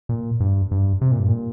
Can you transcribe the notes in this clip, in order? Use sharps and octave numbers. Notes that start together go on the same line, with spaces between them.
A#2
G2
G2
C3
A#2
G2
A#2